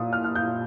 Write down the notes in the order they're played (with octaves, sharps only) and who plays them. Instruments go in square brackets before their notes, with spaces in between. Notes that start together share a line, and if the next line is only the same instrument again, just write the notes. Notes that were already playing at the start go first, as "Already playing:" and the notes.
Already playing: [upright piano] A#2 D#6
F6
F6
G6